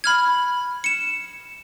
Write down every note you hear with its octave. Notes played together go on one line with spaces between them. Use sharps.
B5 F6 G#6
C#7 E7